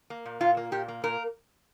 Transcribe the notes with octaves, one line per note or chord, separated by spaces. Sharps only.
A#3
A#2
A#2 F4
A#3
A#2 G4
A#3
A#2 A#4